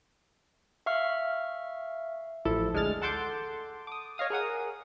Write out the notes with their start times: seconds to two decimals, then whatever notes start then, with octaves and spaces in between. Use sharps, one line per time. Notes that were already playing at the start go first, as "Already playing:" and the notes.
0.86 E5 F5 C#6 F6
2.45 A1 F3 E4 A4
2.73 D2 G#3 D4 F6 A6
3.02 A4 F#5 A5 C6 D6 G6
3.87 D6 D#6
4.18 C#5 D#5 F5 D#6
4.30 G#4 A#4 F#5 D#6